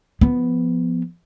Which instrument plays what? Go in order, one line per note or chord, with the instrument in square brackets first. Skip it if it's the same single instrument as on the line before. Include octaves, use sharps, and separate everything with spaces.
[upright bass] F3 B3